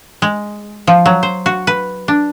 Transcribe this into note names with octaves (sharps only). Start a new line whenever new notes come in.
G#3
F3
F#3
C5
F#4
B4
D4